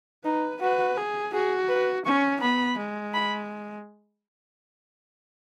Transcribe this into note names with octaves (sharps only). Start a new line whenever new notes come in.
D#4 B4
F#4 B4
G#4
F#4 G#4
B4
C#4 C#6
B3 B5
G#3
B5